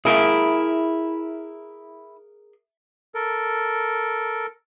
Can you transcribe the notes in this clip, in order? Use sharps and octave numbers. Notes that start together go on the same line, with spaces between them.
E4 G#4 A#4 E5
A4 A#4